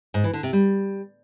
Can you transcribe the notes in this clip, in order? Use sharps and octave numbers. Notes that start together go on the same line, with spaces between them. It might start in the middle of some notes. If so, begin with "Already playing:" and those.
G#2
E3
D3
C3
G3